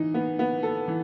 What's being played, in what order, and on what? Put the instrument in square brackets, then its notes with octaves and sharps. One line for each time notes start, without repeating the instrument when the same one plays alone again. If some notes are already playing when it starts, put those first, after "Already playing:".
Already playing: [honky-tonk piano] E3 D#4
B3
B3
A4
E3